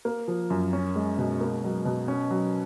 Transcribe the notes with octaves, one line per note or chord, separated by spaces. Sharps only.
A#3
F3
F#2
C#4
G#3
B2
A#3
F#3
B2
C#4
F#3